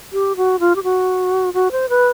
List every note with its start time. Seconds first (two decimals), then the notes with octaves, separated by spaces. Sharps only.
0.13 G4
0.37 F#4
0.60 F4
0.76 G4
0.84 F#4
1.54 F#4
1.72 C5
1.89 B4